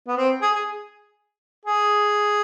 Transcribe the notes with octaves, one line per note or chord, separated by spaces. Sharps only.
B3
C4
G#4
G#4
G#4